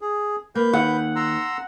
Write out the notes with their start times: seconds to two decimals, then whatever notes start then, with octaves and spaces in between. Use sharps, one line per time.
0.01 G#4
0.55 A#3 B4 G6
0.73 D#2 F#5
1.16 A#5 C6 E6